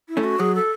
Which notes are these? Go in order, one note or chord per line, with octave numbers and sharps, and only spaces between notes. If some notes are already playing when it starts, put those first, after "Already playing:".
E4
A3 C#4
F#4
F#3 G#4
A4